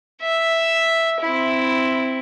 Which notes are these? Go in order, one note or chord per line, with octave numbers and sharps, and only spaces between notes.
E5
C4 E4